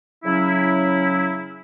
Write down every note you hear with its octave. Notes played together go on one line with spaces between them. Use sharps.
C#3 F#3 C#4 E4